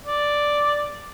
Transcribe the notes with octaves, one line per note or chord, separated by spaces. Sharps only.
D5